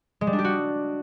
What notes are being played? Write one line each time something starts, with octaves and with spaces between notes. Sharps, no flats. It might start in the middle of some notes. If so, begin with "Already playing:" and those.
G#3
G3
D4
G4
F#4